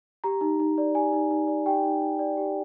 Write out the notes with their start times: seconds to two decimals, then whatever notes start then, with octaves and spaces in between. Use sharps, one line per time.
0.24 G4 A#5
0.41 D#4
0.60 D#4
0.78 D5
0.95 G4 G#5
1.13 D#4
1.31 D#4
1.48 D5
1.66 G4 G5
1.83 D#4
2.01 D#4
2.19 D5
2.37 G4